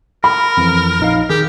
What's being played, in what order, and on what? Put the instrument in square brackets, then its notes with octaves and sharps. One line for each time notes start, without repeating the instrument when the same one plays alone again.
[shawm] A#4 [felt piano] B5
[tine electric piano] F2 E3
A#1 D#4 F5
[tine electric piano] D#3 G#4 [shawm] G4